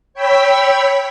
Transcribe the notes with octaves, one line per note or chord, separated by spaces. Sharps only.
C#5 G5 B5 E6 B6